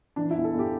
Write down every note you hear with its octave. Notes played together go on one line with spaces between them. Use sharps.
E3 D4
E4
E2
A4
E2 G4